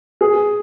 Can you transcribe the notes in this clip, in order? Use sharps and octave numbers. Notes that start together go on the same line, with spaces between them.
G#4